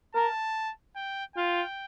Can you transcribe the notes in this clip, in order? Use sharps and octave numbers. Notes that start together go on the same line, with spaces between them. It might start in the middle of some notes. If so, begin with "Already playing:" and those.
A#4 A5
G5
F4 G5